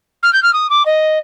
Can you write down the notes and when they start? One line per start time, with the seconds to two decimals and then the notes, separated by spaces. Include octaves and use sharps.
0.23 F6
0.33 G6
0.43 F6
0.53 D#6
0.69 D6
0.85 D#5